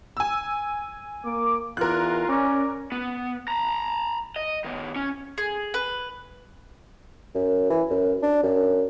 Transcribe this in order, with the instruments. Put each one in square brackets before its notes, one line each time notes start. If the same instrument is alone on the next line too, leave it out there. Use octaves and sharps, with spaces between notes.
[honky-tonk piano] G#5 E6
[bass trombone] A#3 [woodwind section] D6
[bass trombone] E2 [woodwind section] F4 [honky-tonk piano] A#4 F#6
[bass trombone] C#4 [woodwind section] D5 A#5 D6
[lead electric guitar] B3
A#5 B5
D#5
D#3 B3
C#4
[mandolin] G#4
B4
[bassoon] F#2
E3
F#2
D4
F#2